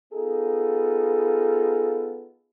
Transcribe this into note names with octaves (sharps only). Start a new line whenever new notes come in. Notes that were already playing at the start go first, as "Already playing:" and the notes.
B3 D#4 F4 G#4 A4